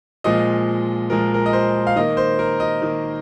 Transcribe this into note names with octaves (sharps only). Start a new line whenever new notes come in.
A#2 F3 G#3 D#5
A#2 F3 G#3 A#4
A#4
D#5
C5
F5
D#3 A#3 D#5
C5
A#4
D#5
D#3 A#3